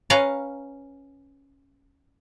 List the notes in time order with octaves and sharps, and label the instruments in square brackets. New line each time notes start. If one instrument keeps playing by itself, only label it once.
[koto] C#4 B4 F5 A#5